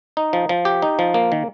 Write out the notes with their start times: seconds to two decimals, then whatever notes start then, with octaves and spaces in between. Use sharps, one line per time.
0.17 D#4
0.33 F3
0.49 F3
0.65 G4
0.82 D#4
0.99 F3
1.14 A#3
1.32 D#3